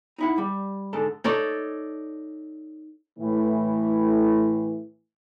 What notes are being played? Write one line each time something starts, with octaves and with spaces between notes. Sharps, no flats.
D#4 E4 F#5
G3
G#2 D3 A4 A5
D#4 A4 C#5 D5
A2 E3